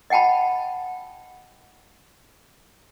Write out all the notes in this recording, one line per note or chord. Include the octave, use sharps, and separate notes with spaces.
D#5 F#5 G5 A5 B5